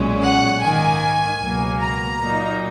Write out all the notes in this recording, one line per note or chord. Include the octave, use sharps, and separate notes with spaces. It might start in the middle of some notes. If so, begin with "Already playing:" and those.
Already playing: B1 A#2 G#3 C#4
F#5
G#2 D#3 A#3 G#5
C#2 B2 F#3 A#3
A#5
A#2 F#3 A#3 D#4